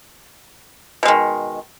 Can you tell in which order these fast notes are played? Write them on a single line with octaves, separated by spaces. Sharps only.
B2 G#3 D#3